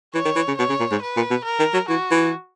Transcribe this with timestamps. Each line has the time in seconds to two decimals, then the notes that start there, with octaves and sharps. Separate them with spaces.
0.14 E3 C#5
0.25 D#3
0.36 E3
0.48 C#3
0.58 B2 C#5
0.69 C#3
0.80 A#2
0.91 G#2
1.02 B4
1.16 A#2
1.30 B2
1.45 A#4
1.59 D#3
1.74 F#3
1.89 E3 F#4
2.11 E3